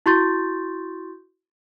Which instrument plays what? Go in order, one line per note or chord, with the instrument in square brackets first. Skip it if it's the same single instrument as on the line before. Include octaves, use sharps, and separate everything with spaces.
[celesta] E4 F#4 C6 C#6 G6 A6